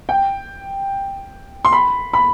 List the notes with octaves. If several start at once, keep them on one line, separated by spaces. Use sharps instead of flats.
G5
C6
B5
B5